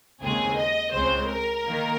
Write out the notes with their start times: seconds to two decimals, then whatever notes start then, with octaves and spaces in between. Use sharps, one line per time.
0.22 D#2 C#3 G#3 C4 G#4
0.58 D#5
0.93 C#2 C#3 G#3 C4 C5
1.30 A#4
1.65 D#3 A#3